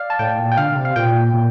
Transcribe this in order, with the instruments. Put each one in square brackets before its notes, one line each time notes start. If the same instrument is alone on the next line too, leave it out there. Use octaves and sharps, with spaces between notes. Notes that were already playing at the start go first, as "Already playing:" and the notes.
Already playing: [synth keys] D5 F5
A5
[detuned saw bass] A2 [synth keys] G5
[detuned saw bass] A#2
[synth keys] G5
[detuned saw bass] D3 [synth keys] F5
[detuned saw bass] D3
C3
[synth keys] F5
[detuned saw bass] A#2 [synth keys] G5
[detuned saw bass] A#2